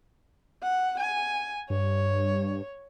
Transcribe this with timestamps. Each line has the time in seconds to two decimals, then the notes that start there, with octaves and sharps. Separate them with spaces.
0.63 F#5
1.00 G#5
1.70 G2 C#5